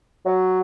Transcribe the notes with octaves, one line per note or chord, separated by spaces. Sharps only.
F#3